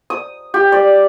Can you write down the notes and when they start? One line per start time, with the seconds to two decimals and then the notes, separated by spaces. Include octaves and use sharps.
0.10 D#6
0.54 G4
0.72 D5